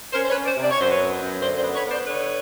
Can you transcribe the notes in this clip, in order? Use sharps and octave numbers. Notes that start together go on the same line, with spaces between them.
C#4 A#4 C5
C5
B4 C#5
C#4
C5 D5
C3
D5
C#5
F#2 C5
B4 C#5
B3
F#2
D3 C5 D5
C5 D5
B3
B4 C#5
B3
C5 D5
D3 B4 C#5